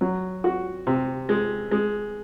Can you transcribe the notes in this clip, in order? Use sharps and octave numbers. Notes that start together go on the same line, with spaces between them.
F#3
F#4
C3
G#3
G#3